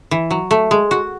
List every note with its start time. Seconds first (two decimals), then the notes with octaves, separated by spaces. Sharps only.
0.11 E3
0.31 F#3
0.51 A3
0.71 G#3
0.91 F#4